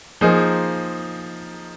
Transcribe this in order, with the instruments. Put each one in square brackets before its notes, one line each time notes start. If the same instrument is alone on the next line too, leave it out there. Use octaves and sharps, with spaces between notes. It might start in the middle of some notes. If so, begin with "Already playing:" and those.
[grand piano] F3 A#3 D#4 G#4 C5